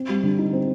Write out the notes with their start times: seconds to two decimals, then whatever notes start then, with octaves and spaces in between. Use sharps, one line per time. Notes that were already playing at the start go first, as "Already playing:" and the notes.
Already playing: C4
0.09 G3
0.23 D3
0.38 D#4
0.53 C4